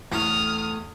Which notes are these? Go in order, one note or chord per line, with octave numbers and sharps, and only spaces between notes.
E2 A2 B3 C#4 D#6 F6